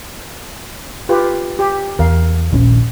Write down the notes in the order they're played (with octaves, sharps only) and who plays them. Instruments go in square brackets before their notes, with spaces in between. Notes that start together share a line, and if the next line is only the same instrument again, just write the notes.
[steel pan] F4 G4 B4
G4
[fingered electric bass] E2 [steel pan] A#4 F5
[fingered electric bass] D#1 A#1 C#4